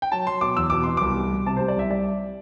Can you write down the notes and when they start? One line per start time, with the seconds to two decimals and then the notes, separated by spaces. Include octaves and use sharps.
0.02 G5
0.12 F#3 A5
0.27 F#3 C6
0.41 B2 D6
0.57 E2 E6
0.70 B2 D6
0.84 B2 C6
0.97 C2 D6
1.16 G3
1.31 G3
1.46 C3 A5
1.57 G3 C5
1.68 D5
1.76 C2 E5
1.90 G3 D5